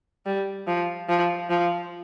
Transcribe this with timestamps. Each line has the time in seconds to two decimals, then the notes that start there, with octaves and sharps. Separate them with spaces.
0.26 G3
0.67 F3
1.09 F3
1.50 F3